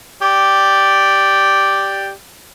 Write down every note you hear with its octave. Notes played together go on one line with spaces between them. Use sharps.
G4 D5